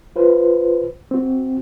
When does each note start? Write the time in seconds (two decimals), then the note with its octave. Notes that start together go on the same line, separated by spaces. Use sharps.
0.16 F4 B4 C5
1.11 C4 F#4